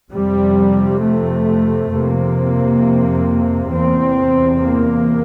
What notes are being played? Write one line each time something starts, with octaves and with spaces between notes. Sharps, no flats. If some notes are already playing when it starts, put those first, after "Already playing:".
F2 C3 G3
A3
F2 C3 A#3
E2 C3 C4
A#3